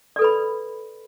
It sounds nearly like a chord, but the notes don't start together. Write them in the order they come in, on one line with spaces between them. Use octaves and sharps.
D5 A4 B4 B5